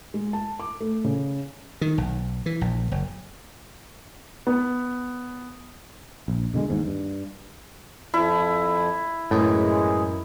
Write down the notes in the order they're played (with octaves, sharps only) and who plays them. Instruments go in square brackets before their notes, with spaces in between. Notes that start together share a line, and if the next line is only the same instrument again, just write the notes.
[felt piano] G#3
A5
D6
A3
C#3
[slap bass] D#3
B1
E3
A#1
F#1
[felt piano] B3
[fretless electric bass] A#1
B2 D3 G3 G#3
G1 D#2 G#2
G2
[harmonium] F2 F3 [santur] E4
[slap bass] F#2 [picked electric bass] A2 [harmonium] E3 G#3 G#4